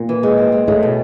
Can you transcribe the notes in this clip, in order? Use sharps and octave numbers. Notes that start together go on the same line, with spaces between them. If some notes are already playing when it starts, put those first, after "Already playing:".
Already playing: A#2
E3
G#3
C4
G#3
A2 G#3
B2